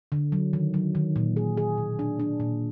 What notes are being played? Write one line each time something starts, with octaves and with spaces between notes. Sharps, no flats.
D3
F#3
D#3
F#3
D#3
A#2
G#4
G#4
B2
D4
D4
A#2